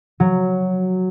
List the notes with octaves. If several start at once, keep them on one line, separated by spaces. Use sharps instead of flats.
F#3